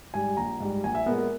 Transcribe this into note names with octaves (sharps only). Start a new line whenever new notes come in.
G#2 G3 G#5
A#1 A#5
G#2 G3
A#1 G#5
E5
A#2 G#3 B3 A#4
A#4